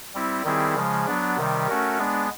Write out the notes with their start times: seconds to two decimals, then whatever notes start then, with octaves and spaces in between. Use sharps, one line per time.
0.14 G3 C4 E4
0.44 D#3 G3 C4 E4 G#4
0.75 C#3 F3 G#3
1.06 F#3 B3 D4
1.37 C3 D#3 G3
1.68 A3 C#4 F#4 A#4
1.98 G#3 B3 D4